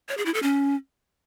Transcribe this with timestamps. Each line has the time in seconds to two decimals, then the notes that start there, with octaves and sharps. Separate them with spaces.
0.09 C#5
0.17 G#4
0.26 E4
0.34 A4
0.43 C#4